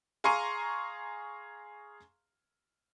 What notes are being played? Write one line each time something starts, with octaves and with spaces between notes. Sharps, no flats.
G#4 F5 A#5 C6 C#6 D#7